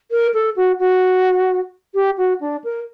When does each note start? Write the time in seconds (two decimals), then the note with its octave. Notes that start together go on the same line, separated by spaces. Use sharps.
0.11 A#4
0.34 A4
0.56 F#4
0.79 F#4
1.95 G4
2.18 F#4
2.41 D4
2.64 A#4